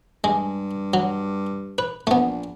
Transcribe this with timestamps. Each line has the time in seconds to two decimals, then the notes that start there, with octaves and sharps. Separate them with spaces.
0.24 G2 G#3
0.94 F#3
1.78 B4
2.07 A#1 A3 B3